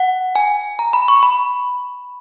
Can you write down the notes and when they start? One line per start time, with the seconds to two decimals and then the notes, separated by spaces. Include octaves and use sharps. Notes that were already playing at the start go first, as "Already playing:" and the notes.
Already playing: F#5
0.36 G#5
0.79 A#5
0.93 B5
1.08 C#6
1.23 B5